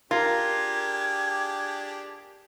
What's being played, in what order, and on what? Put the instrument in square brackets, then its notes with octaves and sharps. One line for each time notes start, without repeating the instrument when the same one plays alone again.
[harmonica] D4 G4 G#4 [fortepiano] F4 [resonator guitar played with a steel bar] A#4 [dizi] G#6